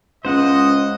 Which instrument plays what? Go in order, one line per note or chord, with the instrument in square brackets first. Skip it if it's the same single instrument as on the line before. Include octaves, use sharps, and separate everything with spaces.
[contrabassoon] C#2 [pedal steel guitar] C5 F#5 [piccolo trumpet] D#5